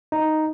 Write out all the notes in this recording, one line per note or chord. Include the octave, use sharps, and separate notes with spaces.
D#4